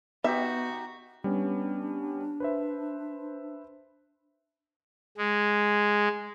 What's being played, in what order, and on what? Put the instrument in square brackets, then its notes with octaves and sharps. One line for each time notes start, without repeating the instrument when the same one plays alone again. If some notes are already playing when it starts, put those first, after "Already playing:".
[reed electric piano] B3 [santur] D#4 G4 [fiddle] F#4 [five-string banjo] E5
[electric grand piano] G3 B3 C#4 [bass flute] D4
[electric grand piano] B4 C5 E5
[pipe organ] G#3